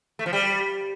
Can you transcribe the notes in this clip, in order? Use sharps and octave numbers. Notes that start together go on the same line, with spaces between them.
A3
F3
G3